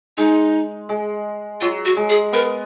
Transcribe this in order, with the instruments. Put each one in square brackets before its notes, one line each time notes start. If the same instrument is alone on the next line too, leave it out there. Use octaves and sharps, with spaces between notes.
[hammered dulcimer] G#3 [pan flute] D#4
[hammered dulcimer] G#3
[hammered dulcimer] F#3 [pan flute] F4
[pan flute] F#4
[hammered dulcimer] G#3
[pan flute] G#4
[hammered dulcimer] B3 [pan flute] A#4